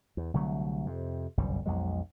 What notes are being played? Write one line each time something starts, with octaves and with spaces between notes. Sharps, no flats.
E2
C2 D3 F#3 A3
F2 C3
G1 C2 F#2 G3
B1 F2 F#3 G#3